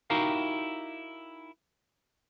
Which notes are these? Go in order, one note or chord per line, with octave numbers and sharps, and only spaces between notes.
D#4 E4 F#4 G4 A#4 F5